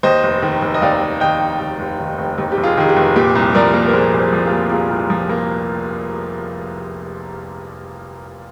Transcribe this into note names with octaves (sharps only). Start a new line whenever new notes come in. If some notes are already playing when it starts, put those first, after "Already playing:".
D#2 C5 D#5
F1
D#3
F1
D#5
D#2 D5 F5
F1
D#3 D#5 G5
F1
D#2
F1
D#3
F1
D#2
G4
F1
F4 G#4
D#3 G#4
G4
F1
A#2 G4
C2
F3 A#4 D5
A#3
A#4
A#2 G#4 C5
C2
G#4 C5
F3
F4 G#4
A#3
A#2 F4 G#4
C2
F3
A#3